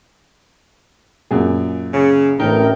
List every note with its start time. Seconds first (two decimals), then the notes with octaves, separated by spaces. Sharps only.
1.31 F#2 A#2 G#4
1.94 C#3
2.40 A1 A2 D4 D#4 A#4 G5